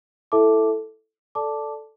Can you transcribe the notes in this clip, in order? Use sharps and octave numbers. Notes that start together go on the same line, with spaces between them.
E4 A4 E5 A5 D6
A4 D5 A5 D6